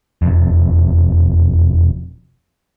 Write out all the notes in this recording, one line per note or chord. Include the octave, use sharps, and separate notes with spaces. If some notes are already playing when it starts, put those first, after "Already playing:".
E1 F2